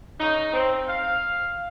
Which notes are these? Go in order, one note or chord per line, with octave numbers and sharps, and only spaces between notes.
C#3 D#4
C4
F5